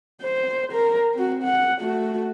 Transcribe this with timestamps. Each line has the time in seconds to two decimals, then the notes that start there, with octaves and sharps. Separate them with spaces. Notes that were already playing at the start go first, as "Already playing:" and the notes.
0.22 C5
0.73 A#4
1.14 C4 F#4
1.44 F#5
1.81 A3 F#4